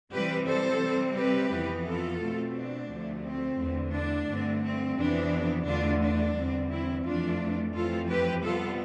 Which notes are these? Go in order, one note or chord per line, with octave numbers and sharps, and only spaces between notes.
C3 E3 G3 C4 G4 B4
A4 C5
C3 G3 C4
G4 B4
F2 E3 B3
F4 A4
B2 A3 C4
D4
D2 C3 F3 A3
C4
E2 D3 A3
D4
G2 D3 A3 C4
C4
F2 C3 E3 B3 D4
E2 D3 A3 D4 F4
D4
E2 D3 G3 C4
C4 E4
F2 E3 A3 D4 F4
F2 E3 A3 C4 F4 A4
G4 B4
C3 G3 B3 F4 A4